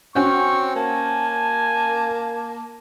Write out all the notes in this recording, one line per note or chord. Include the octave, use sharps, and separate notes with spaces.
C4 C#4 F#4 C#6
A#3 G#5 A5